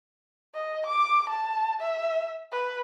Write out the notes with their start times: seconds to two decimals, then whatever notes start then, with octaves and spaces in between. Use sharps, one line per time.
0.54 D#5
0.86 D6
1.29 A5
1.81 E5
2.52 B4